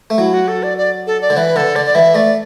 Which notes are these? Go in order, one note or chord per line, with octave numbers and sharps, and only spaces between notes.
A3
F#3 E4
F#4
A4
D5
D5
A4
D5
D3
E3 B4
D3 A4
D3 D5
D5
E3 E5
A3 D5